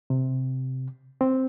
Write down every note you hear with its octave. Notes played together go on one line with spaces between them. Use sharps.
C3
C4